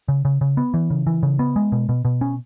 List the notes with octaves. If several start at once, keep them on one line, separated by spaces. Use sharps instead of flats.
C#3
C#3
C#3
B3
E3
C#3
E3
C#3
B3
G#3
B2
B2
B2
C#4